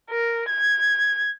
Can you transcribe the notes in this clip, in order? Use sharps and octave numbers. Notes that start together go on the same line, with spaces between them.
A#4
G#6